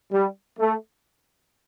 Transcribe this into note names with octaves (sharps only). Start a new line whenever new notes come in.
G3
A3